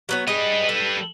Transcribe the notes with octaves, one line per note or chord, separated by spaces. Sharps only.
F#3 B3 C#5
G3 G#4 B4 D#5
A4